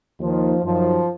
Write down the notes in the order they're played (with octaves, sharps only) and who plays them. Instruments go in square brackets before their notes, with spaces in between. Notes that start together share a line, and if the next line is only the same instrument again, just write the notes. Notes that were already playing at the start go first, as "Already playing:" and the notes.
[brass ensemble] D#2 D#3 F3
F#2 D#3 F3